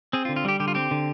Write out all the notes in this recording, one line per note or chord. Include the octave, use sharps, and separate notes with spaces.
C4 G#4
F4
D3
F4
G3 G4
D3 G4
F4
C4 G4
D3